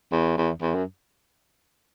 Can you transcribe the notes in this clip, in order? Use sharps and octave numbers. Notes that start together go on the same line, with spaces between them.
E2
E2
E2
F#2